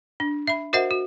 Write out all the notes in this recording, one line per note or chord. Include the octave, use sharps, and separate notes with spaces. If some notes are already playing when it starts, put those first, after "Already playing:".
D4
E5 B5
F#4 A#4 C5 D#5 E5 F#5
F#4